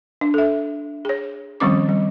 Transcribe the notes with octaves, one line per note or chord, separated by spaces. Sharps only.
D4
A4 E5
G#4 C#5
D#3 F3 G3 C4 C#4 D6
G3